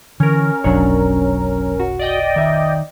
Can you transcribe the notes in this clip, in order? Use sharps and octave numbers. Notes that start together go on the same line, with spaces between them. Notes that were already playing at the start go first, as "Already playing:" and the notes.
D3 E3 C#4 A#4
F1 B1 F#3 D4 C#5
F#4
D5 D#5 G5
D#3 E5